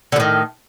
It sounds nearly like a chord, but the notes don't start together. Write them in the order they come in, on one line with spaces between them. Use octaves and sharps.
D3 A2 D#3